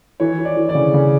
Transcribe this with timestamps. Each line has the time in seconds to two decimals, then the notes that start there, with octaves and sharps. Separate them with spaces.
0.20 E3 C#5
0.39 E3
0.45 D5
0.57 E3
0.69 D5
0.75 C#3
0.94 C#3